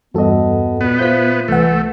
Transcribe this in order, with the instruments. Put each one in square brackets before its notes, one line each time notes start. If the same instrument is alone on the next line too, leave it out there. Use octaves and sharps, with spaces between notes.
[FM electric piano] E2 G2 A4 [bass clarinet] B3 [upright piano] F#4 D#5
[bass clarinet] A#2 [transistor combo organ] B3
[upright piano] F4 C5 E5 [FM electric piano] G6 B6
[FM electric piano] C2 F#5 [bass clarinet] E3 [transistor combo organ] A3